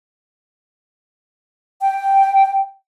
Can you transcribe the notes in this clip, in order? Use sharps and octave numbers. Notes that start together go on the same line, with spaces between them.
G5